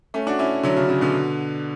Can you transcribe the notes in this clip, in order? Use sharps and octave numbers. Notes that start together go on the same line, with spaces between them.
A3 C#4
D4 F#4
C#4 E4
D3 F#3
C#3
C#3
B2 D3